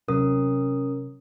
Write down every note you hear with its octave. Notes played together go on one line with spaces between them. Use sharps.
C3 F#3 C4 C#4 A#4 D#6